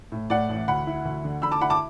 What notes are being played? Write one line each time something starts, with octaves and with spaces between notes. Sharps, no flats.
A2
A2 D5 F#5
A1
D2 F#5 B5
E4
D2
D3
D3 B5 E6
A5 D6
E4 F#5 B5
A5 D6